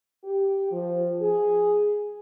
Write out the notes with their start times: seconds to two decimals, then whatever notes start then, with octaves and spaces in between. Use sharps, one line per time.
0.24 G4
0.71 F3
1.21 G#4